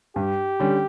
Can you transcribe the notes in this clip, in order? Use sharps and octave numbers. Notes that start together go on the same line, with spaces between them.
G2 G4
D3 G3 C#4